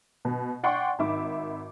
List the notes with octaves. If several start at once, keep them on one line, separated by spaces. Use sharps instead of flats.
B2
D5 F#5 G5 C6 C#6
G#1 D#3 E5 B5 D6